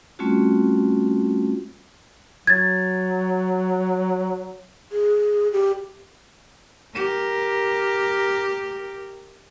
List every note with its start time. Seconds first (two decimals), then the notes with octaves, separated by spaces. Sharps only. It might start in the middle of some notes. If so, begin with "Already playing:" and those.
0.19 G3 A3 C4 C#4 F4 F#4
2.47 F#3 G#6 A6
4.91 G#4
5.53 G4
6.95 G4 A#4